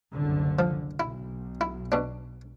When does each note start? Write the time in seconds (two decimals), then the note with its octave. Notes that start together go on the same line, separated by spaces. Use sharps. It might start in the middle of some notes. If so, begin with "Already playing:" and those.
0.13 F#1 C2 D3
0.59 F3
1.00 B1 E4
1.61 E4
1.92 B2 D4